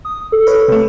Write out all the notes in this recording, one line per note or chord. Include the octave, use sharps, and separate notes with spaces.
D#6
A4
B4 C#5
C3 A3